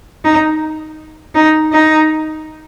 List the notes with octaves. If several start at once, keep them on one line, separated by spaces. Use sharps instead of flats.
D#4
D#4
D#4